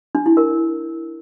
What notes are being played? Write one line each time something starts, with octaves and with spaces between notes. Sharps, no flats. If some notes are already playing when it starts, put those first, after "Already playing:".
D4
E4
A#4